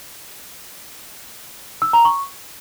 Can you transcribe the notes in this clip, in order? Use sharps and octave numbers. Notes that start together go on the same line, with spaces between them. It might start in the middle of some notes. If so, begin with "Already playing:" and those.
E6
A#5
C#6